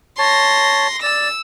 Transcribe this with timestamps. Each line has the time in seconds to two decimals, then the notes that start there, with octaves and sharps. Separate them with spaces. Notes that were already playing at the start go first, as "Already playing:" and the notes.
0.19 C#5 A5 C6 A#6
1.03 D5 E6